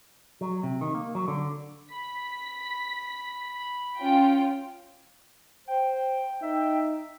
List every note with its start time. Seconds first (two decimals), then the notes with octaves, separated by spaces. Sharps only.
0.41 F#3
0.63 C3
0.81 D#3
0.95 A#3
1.15 F#3
1.28 D3
1.93 B5 B6
3.98 C#4 F4 G5
5.68 C5 G5
6.42 D#4 E5